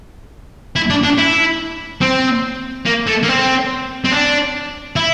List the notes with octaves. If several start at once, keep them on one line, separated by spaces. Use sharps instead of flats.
E4
D4
D4
E4
C4
A#3
A3
A#3
C4
C4
D4
E4